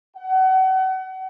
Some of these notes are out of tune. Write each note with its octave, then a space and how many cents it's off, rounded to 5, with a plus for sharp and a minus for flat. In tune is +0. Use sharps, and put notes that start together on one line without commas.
F#5 +35